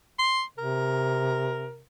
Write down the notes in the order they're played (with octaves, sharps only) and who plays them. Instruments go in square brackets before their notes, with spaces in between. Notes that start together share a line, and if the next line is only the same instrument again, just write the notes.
[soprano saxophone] C6
[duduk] C3 [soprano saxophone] A#4